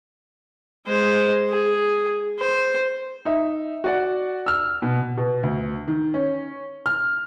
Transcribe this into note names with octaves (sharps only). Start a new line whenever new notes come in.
G#3 C5
G#4
C5
D#4 E5
F#4 D5 F#5
E6 F6
B2
B2
D2
D#3
C#4
F6